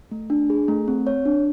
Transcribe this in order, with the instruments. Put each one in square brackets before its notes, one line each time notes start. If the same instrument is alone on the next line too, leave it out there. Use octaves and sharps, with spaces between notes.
[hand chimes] A3
D4
G#4
A3
C4
C#5
D4